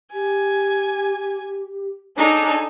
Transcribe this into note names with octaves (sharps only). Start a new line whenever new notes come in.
G4 G#5
D4 D#4 G#4 A4 C#5